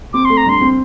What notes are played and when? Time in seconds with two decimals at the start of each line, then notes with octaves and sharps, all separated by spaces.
0.13 C4 D6
0.25 A3 C6
0.37 A#5
0.46 G2 C6
0.61 C4